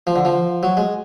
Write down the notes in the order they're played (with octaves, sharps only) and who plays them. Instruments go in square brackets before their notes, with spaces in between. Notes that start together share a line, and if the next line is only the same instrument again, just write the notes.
[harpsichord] F3
D3
F3
F#3
G#3